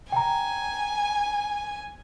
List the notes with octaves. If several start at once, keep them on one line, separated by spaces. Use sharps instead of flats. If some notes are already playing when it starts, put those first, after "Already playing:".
G5 G#5 A#5